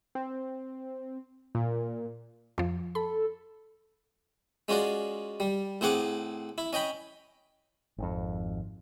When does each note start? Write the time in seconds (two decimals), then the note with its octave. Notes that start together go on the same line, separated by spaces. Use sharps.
0.15 C4
1.55 A#2
2.58 F2 F3
2.95 A4 B5
4.68 G#3 C#4 F4 F#4 D5
5.40 G3
5.81 A2 C4 G#4 F#5 D6 D#6
6.58 E4
6.73 C#4 D#5 G5 B5
7.98 G#1 F2